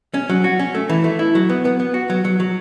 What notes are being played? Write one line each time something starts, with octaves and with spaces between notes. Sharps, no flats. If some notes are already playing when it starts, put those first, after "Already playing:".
C#4
F#3
F#4
C#4
A3
E3
A3
E4
F#3
B3
B3
B3
F#4
F#3
F#3
F#3